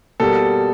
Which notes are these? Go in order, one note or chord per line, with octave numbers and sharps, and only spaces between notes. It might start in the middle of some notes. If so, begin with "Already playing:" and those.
B2 G3 A#3 A4